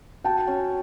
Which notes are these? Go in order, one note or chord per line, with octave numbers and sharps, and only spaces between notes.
F#4 G5 A5
C#4